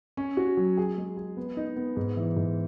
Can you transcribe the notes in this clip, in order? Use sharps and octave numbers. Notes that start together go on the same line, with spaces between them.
C#4
F#4
F#3
G#4
G#3
G#4
B3
D#4
B3
G#2
E3
G#2